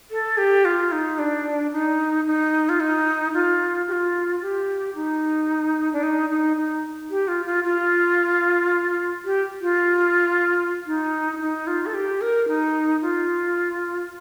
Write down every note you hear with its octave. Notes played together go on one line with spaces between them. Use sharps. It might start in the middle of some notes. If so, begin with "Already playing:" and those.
A4
G4
F4
D#4
D4
D#4
D#4
F4
D#4
F4
G4
F4
G4
D#4
D4
D#4
D#4
D#4
G4
F4
F4
F4
G4
F4
D#4
D#4
F4
A4
G4
A#4
D#4
F4